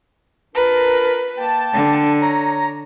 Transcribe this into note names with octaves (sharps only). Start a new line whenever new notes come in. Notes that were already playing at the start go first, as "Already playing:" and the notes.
D4 F4 A#4 B4
A#3 G5 A5
D3
C#5 A#5